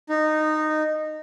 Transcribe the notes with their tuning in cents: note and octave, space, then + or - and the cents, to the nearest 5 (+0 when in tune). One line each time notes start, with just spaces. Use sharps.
D#4 -15